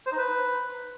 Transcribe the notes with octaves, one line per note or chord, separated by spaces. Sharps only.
C5
D#4
B4